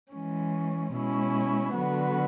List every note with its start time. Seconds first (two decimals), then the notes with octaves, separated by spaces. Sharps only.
0.13 E3 G#3 C#4
0.94 B2 G#3 C#4 E4
1.74 D3 F#3 B3 F#4 B4